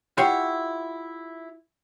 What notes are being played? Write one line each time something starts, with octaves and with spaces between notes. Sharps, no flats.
E4 F4 G4 C#5 F5 F#5